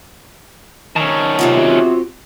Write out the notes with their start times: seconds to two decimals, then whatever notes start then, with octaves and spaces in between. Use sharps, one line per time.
0.96 D#3 C#4 A5 A#5 C#6
1.39 C3 F#3 B3 F4
1.57 C4 F#4 G4